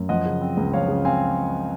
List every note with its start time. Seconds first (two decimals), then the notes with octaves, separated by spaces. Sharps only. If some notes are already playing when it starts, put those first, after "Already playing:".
Already playing: F#2
0.09 F3 D#5 F#5
0.25 C#3
0.41 C4
0.57 C#2
0.73 F3 C#5 F5
0.88 C#3
1.05 C4 F5 G#5